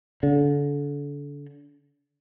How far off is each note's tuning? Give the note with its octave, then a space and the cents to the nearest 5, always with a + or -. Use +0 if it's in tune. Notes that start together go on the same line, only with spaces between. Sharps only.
D3 -35